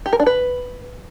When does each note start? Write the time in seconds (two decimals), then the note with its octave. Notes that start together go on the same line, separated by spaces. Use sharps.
0.06 G4
0.13 A#4
0.20 D4
0.26 B4